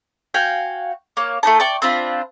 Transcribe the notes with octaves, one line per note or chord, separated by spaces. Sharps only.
F#4 F5 G5 G#5
A#3 C#5
A3 B3 D#4 A5
D5 G5 C#6
C4 D4 F4 B5